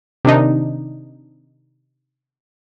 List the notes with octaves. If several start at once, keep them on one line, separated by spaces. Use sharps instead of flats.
C3 D#3 D4 D#4